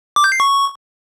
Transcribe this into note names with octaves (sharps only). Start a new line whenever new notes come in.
D6
G6
C7
C#6